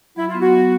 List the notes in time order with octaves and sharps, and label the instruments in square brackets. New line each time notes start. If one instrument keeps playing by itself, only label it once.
[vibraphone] F#3 [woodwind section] E4
[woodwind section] F4
[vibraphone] B3
[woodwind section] F#4
[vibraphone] F#3